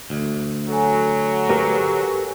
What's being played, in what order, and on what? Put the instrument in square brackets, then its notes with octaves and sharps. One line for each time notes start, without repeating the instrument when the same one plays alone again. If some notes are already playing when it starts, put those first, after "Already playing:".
[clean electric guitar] D2
[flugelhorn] F#3 [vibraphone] A4 G#5
[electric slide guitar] G4 A#4 B4